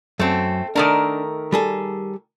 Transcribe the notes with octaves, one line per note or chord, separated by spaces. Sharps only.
F#2 A3 C4
D#3 A3 D4 A#4
G3 G#4 A4